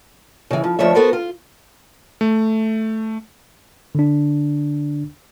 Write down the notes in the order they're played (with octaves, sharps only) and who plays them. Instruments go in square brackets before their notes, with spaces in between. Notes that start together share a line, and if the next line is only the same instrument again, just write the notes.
[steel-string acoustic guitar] C#3 E3
F3
D2 F3 A3 C#5 E5
B3 F#4 A4 A#4 C5
F4
[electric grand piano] A3
[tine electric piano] D3 D4